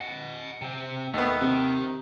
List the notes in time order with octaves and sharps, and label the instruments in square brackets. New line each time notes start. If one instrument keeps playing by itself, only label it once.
[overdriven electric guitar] D#5 F#5
C3 C4
[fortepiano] D#2 B3 [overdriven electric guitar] A3
[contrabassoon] C3 [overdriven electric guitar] D#3